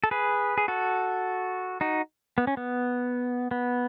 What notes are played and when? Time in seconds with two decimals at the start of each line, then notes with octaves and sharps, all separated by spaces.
0.04 A4
0.11 G#4 B4
0.58 G#4
0.68 F#4 A4
1.81 D#4 F#4
2.38 B3
2.47 C#4
2.57 B3
3.51 B3